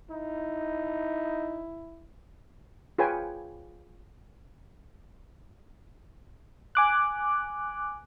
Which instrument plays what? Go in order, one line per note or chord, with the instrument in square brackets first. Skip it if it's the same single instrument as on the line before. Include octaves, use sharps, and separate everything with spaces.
[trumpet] D#4 [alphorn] E4
[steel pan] F4 G#4 B4 C#5 G5 G#5
[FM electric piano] G#5 D6 F#6